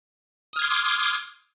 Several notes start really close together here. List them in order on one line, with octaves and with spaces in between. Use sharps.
D#6 F6 G#6 C6 D6